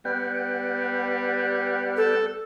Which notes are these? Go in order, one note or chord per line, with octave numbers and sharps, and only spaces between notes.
G3 B3 F#5 G5
A4